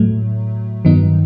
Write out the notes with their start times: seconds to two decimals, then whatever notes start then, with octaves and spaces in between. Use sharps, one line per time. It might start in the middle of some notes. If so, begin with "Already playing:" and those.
Already playing: A2 F#3 A3
0.85 G2 D#3 F#3 B3 D#4